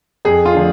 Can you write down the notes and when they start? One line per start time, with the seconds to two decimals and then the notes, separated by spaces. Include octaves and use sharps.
0.25 F2 G#4
0.45 F4
0.55 D3 F3 A3